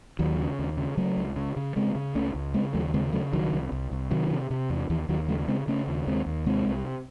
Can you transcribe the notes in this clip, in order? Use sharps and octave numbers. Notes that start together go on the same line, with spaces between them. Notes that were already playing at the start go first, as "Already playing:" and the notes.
D#2 D#3 F#3
C#3
D#2
C#3
C#3 F#3 A3
C#2
C#3
C#3
C#3 G#3 C4
C#3
C#2 A3 C#4
C#2
C#3 G#3 C4
D#2 F#3 A3
C#3 G#3 C4
C#3 F#3 A3
C2 D#3 F#3
C2
C2
C2
C3 D#3 F#3
C3
C3
E2
D#2 E3
D#2 D#3 F#3
C#3 F#3 A3
C#3 G#3 C4
C#3 A3 C#4
D#2
D#2 G#3 C4
D#2
C3 G#3 C4
C2